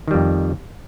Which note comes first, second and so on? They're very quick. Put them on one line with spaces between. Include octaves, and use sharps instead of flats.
D#3 G3 F2